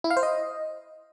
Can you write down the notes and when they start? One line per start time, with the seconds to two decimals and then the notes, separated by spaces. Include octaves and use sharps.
0.04 E4
0.10 F5
0.17 C5
0.23 D#5